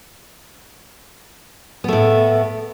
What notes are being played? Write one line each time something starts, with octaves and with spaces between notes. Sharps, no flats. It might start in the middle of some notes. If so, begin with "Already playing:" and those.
A2 A3 B3